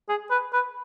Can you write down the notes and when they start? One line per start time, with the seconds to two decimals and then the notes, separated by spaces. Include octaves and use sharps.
0.09 G#4
0.30 B4
0.53 B4